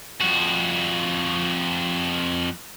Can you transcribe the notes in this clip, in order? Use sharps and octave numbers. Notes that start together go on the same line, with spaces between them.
F2 F#4